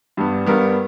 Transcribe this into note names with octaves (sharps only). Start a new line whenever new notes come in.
G2 G3 B3
G2 G3 B3 A#4